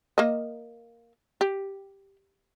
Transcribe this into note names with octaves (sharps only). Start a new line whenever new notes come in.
A#3 D#5
G4